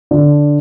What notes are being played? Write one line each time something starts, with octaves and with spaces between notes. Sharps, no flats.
D3